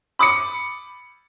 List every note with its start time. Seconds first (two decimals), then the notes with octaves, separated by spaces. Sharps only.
0.19 B5 D6 D#6 C#7